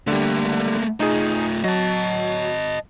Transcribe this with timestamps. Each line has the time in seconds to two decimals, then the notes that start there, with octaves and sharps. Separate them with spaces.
0.07 D3 G3 A3 A#3
1.00 A3 D#4 F4 G#4
1.64 F#3 D#5 A5